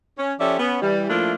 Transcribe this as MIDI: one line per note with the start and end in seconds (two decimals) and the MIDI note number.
0.18 0.33 61
0.40 0.58 53
0.40 0.58 61
0.40 0.58 67
0.40 0.58 69
0.40 0.58 74
0.40 0.58 76
0.59 0.81 59
0.59 0.81 61
0.82 1.08 52
0.82 1.08 55
1.09 1.34 53
1.09 1.34 57
1.09 1.34 58
1.09 1.34 62
1.09 1.34 64
1.09 1.34 65